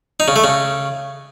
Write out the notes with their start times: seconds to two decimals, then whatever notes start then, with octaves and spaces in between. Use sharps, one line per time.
0.20 D#4
0.28 C#3
0.36 A3
0.44 C#3